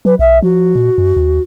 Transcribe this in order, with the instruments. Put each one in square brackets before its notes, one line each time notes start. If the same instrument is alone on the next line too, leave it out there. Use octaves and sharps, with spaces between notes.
[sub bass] F#3 [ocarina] B4
[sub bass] B1 [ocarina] E5
[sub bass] F3 [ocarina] F#4
[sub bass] A#2
F#2
D#2